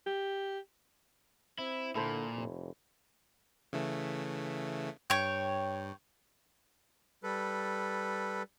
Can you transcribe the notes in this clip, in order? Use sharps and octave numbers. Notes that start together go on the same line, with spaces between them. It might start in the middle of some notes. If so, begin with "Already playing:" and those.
G4
C4 E4
A#2 D3 E4 A4 C5
F1
C#3 E3 A3
G2 C#5 G5
G3 A4 B4